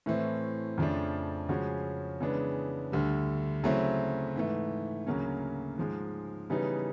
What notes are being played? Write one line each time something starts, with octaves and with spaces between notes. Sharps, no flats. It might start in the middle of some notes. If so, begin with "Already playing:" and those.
A2 E3 A3 C4
F2 C#3 F3 A3 D4
C#3 F3 G#3 C#4 F#4
C#3 E3 G#3 B3 D4
D2 D3 G3
C#3 F#3 A3 C4 E4
G#2 E3 A3
D2 C#3 F#3 A#3 C#4
G#2 F3 G#3
C#3 E3 G3 B3 D#4